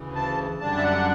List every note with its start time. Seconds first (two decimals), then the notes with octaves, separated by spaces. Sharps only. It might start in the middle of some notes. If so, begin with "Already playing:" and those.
Already playing: D2 C#3 E3
0.15 A5
0.60 F#2 D3 G3 D4 A5
0.77 E5
0.83 F#5